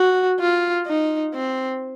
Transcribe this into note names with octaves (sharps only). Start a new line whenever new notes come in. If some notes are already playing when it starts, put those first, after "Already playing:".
Already playing: F#4
F4
D#4
C4